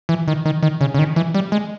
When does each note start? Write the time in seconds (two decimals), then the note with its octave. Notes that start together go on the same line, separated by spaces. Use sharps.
0.09 E3
0.28 D#3
0.45 D#3
0.63 D#3
0.81 C#3
0.94 C#3
0.99 D#3
1.16 E3
1.34 G3
1.52 G#3